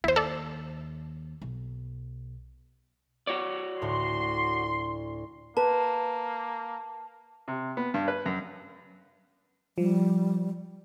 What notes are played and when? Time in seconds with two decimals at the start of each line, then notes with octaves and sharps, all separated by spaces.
0.04 D#2 E4 C5
0.16 A4 D5
1.42 B1
3.27 F#4 C#5 D5
3.82 D2 A2 C6
5.57 A#3 B4 A5
7.48 C3
7.77 B3
7.94 G2
8.08 B4
8.26 F#2
9.78 F3 G3